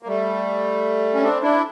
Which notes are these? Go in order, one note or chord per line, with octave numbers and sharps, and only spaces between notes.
A#3
G3 A3
C#4
C4 D4
D4 E4